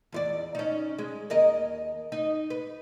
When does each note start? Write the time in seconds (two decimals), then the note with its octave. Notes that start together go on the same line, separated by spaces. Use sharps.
0.12 E2 F4 D5
0.55 C#4 D#4
0.99 G#3
1.30 D#2 A#4 D#5
2.12 D#4
2.50 B4